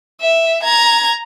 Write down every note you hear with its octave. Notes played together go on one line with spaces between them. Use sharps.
E5
A#5 G#6